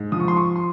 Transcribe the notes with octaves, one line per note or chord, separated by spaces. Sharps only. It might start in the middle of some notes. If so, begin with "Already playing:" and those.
Already playing: G#2
F3 D#6
C#6
C6
C#6
C6